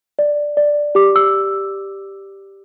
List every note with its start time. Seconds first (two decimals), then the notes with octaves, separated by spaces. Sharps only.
0.19 D5
0.57 D5
0.95 G4 D6
1.16 E6